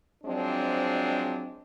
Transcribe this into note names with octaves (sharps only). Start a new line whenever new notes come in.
F3 F#3 G#3 C4 D4